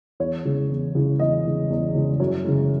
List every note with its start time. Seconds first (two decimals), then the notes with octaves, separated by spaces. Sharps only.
0.20 E2 C#5
0.45 C#3 E3 G#3
0.70 E2
0.95 C#3 E3 G#3
1.19 E2 D#5
1.45 C#3 E3 G#3
1.70 E2
1.95 C#3 E3 G#3
2.20 F#2 C#5
2.44 C#3 E3 G#3